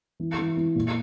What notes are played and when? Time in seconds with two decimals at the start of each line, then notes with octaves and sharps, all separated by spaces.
0.20 E3
0.38 E3
0.57 E3
0.75 A#2